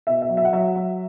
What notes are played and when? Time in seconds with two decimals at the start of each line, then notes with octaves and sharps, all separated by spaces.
0.07 B2 E5
0.22 E5
0.29 F#3
0.37 E5
0.45 F#5
0.53 F#3 E5
0.75 F#3